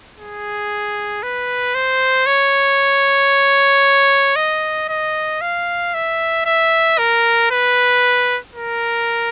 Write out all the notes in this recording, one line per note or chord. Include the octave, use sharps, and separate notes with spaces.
G#4
B4
C5
C#5
D#5
D#5
F5
E5
E5
A#4
B4
A#4